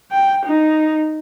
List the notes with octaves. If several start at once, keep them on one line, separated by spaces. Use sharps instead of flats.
G5
D#4